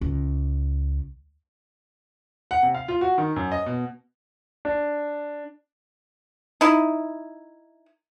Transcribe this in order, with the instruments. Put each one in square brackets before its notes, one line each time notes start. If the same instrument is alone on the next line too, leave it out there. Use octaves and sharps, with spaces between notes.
[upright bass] C#2
[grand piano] F#5
C3
F5
F4
F#4
D#3
F#2
D#5
B2
D4
[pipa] D#4 E4